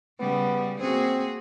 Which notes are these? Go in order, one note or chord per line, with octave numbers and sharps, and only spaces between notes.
C#3 G3 B3
A#3 C4 F#4 G#4